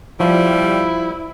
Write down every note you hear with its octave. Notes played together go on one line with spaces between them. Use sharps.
B2 F3 G3 E4